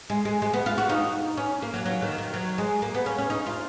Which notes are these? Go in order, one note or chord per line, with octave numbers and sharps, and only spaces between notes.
G#3
G#3
G#3
B3
F4
F#4
D#4
C#4
A#3
F#3
F#3
D#3
D#3
F#3
G#3
A#3
B3
C#4
C#4
D#4
F4